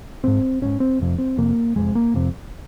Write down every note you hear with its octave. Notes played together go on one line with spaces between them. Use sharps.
G#1 G#2 C4
G#1 G#2 C#4
C4
F1 F2 C3
C4
F1 F2 C3 A#3
F1 F2 C3 G#3
A#3
F1 F2 C3